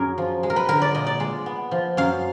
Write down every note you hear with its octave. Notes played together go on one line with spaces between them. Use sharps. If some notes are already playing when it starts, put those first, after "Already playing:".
Already playing: F#2 G#4 A#4
F3
G#3
A#4
B4
D3 A#4
D5
A#2 D#5
D5
G#3
B3
F3
F#2 F5